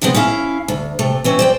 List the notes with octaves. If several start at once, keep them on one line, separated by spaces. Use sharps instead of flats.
C3 F3 G#3 B3 C4
C#4 E4 E5 F5
D2
C3 A3
E3 C4 C#4
C5 D5 G5